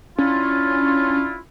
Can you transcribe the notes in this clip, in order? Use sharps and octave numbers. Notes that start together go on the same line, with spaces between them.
C#4 D4 E4 F4